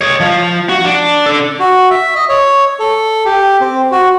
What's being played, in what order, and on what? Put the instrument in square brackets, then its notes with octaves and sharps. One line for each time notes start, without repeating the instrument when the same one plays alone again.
[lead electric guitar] C#5 D#5
F3
F#4
D4
D4 A4
[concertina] F#4
E5
D#5
C#5
A4
G4
C4
F#4